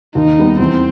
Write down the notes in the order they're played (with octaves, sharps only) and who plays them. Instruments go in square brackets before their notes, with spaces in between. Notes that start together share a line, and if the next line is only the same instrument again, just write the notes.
[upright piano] D#2 [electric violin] D#4
[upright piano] D#3 G3 B3
[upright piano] E2 [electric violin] C4